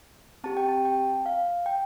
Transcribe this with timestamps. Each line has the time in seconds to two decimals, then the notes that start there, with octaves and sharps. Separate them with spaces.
0.44 C4 G4 A5
0.57 G5
0.68 A5
0.85 G5
1.26 F5
1.66 G5